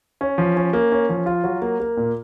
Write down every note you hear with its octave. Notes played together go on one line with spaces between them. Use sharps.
C#4
F3
C#4
A#3
C#4
F3
F4
F#3
A#3
A#3
A#2